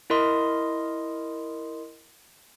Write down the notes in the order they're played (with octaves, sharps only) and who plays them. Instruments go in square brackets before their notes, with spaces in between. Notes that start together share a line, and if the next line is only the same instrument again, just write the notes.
[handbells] E4 A#4 D#5 C6 D#6